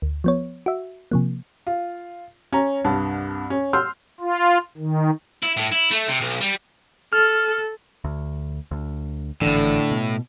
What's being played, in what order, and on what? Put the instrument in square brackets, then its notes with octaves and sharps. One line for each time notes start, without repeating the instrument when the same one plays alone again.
[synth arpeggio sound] D2
F3 B3 C#5
F#4 E5
C3 F3 A#3
[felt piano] F4
C#4 A#5
C2 G2 A5
C#4
C6 E6 F6 G6
[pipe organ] F4
D#3
[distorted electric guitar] E4
A2
E4
A3
C3
B1
G3
[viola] A4 [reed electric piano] F6
[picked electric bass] D2
D2
[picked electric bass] G#1 E3 [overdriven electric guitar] A2 [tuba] D3
[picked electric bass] B2